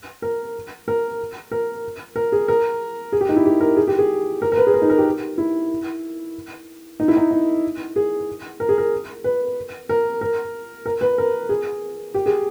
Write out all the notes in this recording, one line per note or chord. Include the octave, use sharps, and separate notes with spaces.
A#4
A#4
A#4
A#4
G#4
A#4
G#4
G4
D#4
E4
G4
A#4
G#4
G4
G#4
A#4
A#4
B4
G#4
A#4
D#4
A#4
G4
E4
D#4
E4
D#4
D#4
G#4
A#4
G#4
A#4
B4
A#4
A#4
A#4
B4
A#4
G#4
G4
G#4